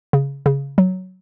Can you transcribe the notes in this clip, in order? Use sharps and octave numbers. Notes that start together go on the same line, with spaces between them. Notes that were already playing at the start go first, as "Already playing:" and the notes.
C#3
C#3
F#3